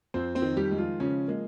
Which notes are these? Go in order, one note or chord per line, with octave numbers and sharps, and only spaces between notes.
F2 C4 C5
C4 C5
D#3
G3 G4
G#3
F3 F4
C#3 F3 C#4
G#3 A#3